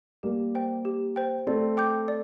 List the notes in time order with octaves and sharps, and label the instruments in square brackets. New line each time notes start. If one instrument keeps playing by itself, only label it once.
[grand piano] G3 A#3 [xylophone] G4
[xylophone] C5 G5
G4
C5 G5
[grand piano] A3 C4 [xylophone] D5
[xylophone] G5 D6 G6
D5